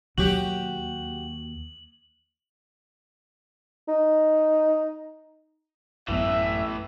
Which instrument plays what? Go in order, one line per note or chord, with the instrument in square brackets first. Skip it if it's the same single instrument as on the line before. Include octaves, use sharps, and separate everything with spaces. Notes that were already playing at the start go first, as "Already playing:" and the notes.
[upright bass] D#2 [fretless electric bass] B2 F#3 [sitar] F#4 G4 [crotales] F#7
[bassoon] D#4
[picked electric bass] A1 F#2 B3 [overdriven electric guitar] A2 E3 [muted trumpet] E5